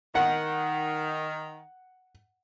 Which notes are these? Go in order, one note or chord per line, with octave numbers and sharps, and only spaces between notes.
D#3 F#5